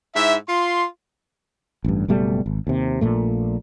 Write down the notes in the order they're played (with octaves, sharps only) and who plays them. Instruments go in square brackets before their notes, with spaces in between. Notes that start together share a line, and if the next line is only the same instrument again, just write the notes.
[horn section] G#2 E4 E5
F4 C6
[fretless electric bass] A1 G2
F#1 B2 G3 A3
G#1
D#2 C3
A#1 A#2 A3